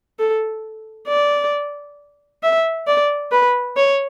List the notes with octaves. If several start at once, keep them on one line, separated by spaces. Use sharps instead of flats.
A4
D5
E5
D5
B4
C#5